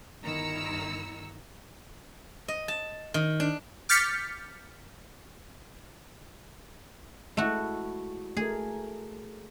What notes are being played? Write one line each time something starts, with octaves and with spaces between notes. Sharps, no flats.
G1 D#3 E4 A#5 E6 C#7
D#5
A5
D#3
D4
D6 F6 G6 A6 B6 C#7
G#3 A3 E4 F#4
A3 G#4 A#4